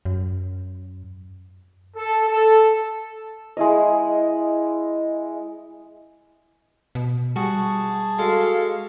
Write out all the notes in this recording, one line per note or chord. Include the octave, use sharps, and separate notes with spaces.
F#2
A4
A4
G#3 E4 D#5
B2
G3 F#4 G#4 A5
G#3 F#4 A4 F5